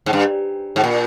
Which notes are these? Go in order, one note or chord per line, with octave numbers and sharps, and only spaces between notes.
G#2
G2
G#2
A#2